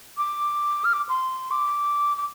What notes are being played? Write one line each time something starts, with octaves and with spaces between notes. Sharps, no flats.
D6
F6
D6
C6
D6
D6